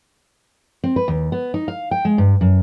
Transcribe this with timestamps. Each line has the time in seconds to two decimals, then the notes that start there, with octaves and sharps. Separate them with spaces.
0.84 C4
0.96 B4
1.08 D#2
1.32 B3
1.54 D#4
1.68 F5
1.91 G5
2.05 G#3
2.18 G2
2.41 F#2